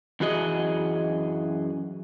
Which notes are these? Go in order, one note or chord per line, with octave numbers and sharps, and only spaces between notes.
F#2 E3 F#4 G#4 D#5